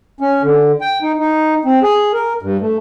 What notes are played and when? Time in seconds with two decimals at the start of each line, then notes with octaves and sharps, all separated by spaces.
0.20 C#4
0.43 D3
0.81 G5
1.02 D#4
1.19 D#4
1.65 C4
1.83 G#4
2.13 A#4
2.42 G2
2.61 A3